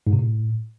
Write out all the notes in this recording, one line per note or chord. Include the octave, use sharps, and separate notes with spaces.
G#2
C3
A2